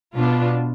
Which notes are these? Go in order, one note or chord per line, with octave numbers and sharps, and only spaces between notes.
B2 B3 D4 F4